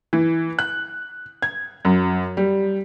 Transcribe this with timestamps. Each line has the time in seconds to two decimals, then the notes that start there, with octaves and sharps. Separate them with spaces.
0.13 E3
0.59 F#6
1.42 G#6
1.85 F#2
2.37 G3